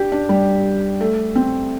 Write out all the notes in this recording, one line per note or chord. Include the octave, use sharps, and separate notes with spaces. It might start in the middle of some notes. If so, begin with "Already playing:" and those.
Already playing: D4 G4
D4
G3
A3
C4